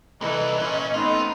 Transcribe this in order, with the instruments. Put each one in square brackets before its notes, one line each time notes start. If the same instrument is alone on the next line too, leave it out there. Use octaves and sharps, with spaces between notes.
[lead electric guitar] C2 [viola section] E3 A4 [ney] D#5
[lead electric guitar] A#2 [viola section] C#4
[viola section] A3 B3 C4 [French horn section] D#4 [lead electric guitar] F4